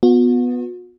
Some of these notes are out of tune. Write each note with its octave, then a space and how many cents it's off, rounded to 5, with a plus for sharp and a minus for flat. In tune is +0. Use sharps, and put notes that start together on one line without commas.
B3 +0 F#4 -45